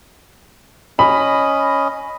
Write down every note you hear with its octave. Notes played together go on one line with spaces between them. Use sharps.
C#4 D#5 B5